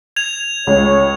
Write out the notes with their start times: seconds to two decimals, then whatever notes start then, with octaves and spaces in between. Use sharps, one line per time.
0.16 G#6 F7
0.67 C#2 C#5